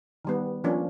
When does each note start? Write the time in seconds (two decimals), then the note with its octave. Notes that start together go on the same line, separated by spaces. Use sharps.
0.25 D#3 G3 B3
0.64 F3 A#3 C#4 D4